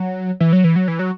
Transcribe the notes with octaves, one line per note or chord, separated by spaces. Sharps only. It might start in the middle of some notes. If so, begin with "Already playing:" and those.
Already playing: F#3
E3
F#3
E3
F#3
E3
F#3